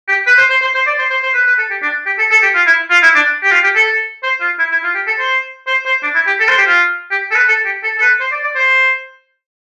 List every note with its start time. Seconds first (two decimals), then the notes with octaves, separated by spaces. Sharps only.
0.08 G4
0.27 B4
0.38 C5
0.50 C5
0.62 C5
0.75 C5
0.87 D5
0.99 C5
1.10 C5
1.23 C5
1.34 B4
1.47 B4
1.58 A4
1.70 G4
1.82 D4
2.06 G4
2.18 A4
2.31 A4
2.43 G4
2.55 F4
2.67 E4
2.90 F4
3.03 E4
3.15 D4
3.43 G4
3.52 F4
3.64 G4
3.75 A4
4.23 C5
4.41 F4
4.59 E4
4.72 E4
4.84 F4
4.95 G4
5.07 A4
5.20 C5
5.67 C5
5.86 C5
6.03 D4
6.15 E4
6.27 G4
6.40 A4
6.49 C5
6.58 G4
6.67 F4
7.11 G4
7.31 A4
7.35 B4
7.48 A4
7.65 G4
7.84 A4
7.98 A4
8.01 B4
8.20 C5
8.32 D5
8.44 D5
8.55 C5